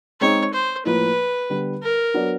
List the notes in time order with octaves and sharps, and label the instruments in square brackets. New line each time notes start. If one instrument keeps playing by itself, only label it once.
[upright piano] G#3 C4 D#4 [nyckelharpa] C#5
[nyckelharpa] C5
[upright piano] A2 F3 A#3 [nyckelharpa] B4
[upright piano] D3 G3 B3
[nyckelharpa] A#4
[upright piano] F#3 B3 D4 F#4